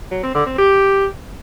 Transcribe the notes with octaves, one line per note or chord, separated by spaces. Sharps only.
F#3
C4
D3
C4
G4